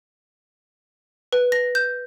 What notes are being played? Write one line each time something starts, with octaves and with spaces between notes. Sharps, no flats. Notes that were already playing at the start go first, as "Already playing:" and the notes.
B4
A#6
G6